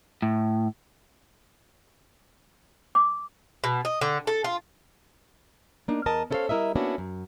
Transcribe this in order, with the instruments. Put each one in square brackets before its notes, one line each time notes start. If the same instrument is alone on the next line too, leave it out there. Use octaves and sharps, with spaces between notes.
[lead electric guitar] A2
[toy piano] D6
[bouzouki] B2
D#5
D3
A4
F4
[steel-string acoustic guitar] A#3 D4 D#4
E2 A#4 D#5 A5
C#4 E4 A4 C5 C#5 F5
G3 E4 A#4 D#5 E5
A#3 B3 C#4 D4 E4 F#4
F#2